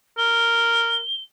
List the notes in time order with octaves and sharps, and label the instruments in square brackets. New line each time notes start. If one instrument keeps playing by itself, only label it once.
[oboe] A#4 [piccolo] G7